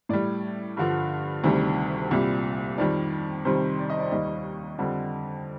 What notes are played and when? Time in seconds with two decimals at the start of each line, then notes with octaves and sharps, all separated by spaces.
0.09 A2 G3 D5
0.77 G2 D3 F3
1.44 D2 C3 D#3 G3
2.11 C2 A#2 G3
2.78 F2 D#3 G3 D5
3.45 F2 C3 D#3 G3 C5
3.79 D5
3.90 D#5
4.00 D5
4.11 D#2 D#3 G3 D#5
4.78 F2 D3 G3